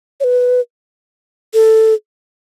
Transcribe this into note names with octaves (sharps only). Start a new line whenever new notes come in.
C#5
B4
A4